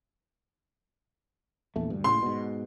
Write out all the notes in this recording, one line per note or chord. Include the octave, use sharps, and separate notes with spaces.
A#1 E2 A3
D2 G2
F#1 A2 C#3 C6
G#2 B2